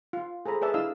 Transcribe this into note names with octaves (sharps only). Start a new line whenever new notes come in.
F4
G#4 A4 C5 A#5 B5
G#4 B4 D5 E5 A5
D4 E4 D#5 F5 E6